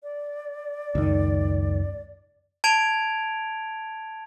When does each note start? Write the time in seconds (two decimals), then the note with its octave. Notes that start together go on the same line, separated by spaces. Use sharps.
0.03 D5
0.95 C#2 F#2 D#3
2.64 A5 G#6 D7 F7